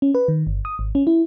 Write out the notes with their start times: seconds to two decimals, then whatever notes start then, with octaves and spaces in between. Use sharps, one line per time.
0.02 C#4
0.15 B4
0.28 D#3
0.47 G1
0.65 D#6
0.79 G#1
0.95 C#4
1.07 E4